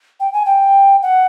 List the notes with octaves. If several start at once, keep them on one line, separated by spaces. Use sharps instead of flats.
G5
G#5
G5
F#5